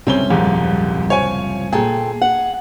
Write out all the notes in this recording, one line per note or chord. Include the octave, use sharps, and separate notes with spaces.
F#1 C2 A2 C4 C#4 G7
D#1 F2 G#2
F3 C#5 G#5
A#2 G#4 A4 G5
F#5